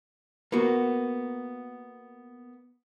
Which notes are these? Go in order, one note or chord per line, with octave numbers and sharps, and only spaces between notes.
A#3 B3 F#4